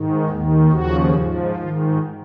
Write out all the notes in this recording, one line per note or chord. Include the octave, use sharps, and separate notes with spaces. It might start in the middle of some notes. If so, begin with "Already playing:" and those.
Already playing: G#2 D#3
D#2 D#3
D#2 C#3 F3 F#4
G#2 F3
G#2 D#3 F4